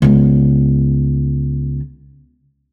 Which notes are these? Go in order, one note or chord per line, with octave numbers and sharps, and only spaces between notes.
C#2 B3